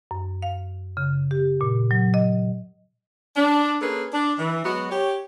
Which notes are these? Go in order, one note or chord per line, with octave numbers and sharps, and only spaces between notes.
F#2
F5
C#3
G4
A#2
F#3
D#5
D4
A#3 C#4 G#4 A4 B4
D4
E3
F#3 G#3 B3 F#4
G4 C#5